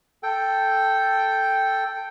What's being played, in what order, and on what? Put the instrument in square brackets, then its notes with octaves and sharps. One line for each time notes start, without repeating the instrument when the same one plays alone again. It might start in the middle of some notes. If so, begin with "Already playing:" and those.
[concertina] A4 G5